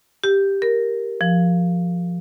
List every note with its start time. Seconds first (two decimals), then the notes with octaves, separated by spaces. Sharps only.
0.24 G4
0.62 A#4
1.21 F3